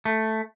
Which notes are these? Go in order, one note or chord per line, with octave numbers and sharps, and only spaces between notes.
A3